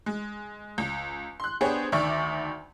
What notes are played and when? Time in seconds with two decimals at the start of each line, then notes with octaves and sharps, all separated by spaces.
0.06 G#3
0.78 C#2
1.40 C6 F#6
1.61 B3 D4 G4 G#4 C5 C#5
1.92 D2 D#3 D5 E5 C#6 D6